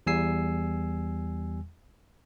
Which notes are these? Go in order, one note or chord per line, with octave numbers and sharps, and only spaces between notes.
E2 G3 G#5 E6 C7